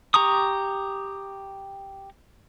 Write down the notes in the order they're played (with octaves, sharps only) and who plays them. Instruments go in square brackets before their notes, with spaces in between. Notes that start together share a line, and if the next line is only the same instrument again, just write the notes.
[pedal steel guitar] G4 A#5 C#6 D#6